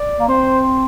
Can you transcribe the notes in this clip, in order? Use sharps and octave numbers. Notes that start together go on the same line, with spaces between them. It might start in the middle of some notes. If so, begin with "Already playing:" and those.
Already playing: D5
A#3
C4 C5